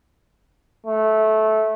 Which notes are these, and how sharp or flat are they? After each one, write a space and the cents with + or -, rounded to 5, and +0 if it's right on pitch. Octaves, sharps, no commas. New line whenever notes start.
A3 -15